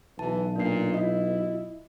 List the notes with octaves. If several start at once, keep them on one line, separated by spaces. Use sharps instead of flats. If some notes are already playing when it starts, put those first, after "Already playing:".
B1 E3 A5
A#2 D4 C7
E4 F4 D#5